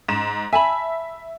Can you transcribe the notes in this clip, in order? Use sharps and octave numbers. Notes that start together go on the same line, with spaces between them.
G#2 E7
E5 G#5 A5 B5